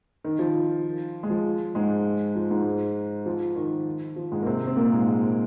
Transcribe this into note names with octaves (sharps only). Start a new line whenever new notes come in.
D#3
F3
G#3
F3
G#2 G#3
F3
G#2 G#3
F3
D#3
F3
G#2 G#3
A#3
C3 C4
C4
A#2 A#3
G#2 G#3